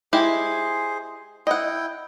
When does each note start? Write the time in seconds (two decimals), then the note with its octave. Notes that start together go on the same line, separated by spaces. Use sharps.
0.13 G#3 E4 G4 G#4 C5
1.47 E4 D#5 F#5 G5